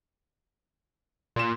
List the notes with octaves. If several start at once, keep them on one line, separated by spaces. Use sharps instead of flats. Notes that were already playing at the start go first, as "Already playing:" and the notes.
A#2 C6 E7